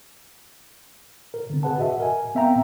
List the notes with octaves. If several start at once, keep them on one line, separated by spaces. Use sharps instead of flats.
A#4
D3 C4
G#4 B4 F#5 A5
F#4 D#5 E5 F#5
A#4 G#5
B3 C4 E5 F5 G5 A#5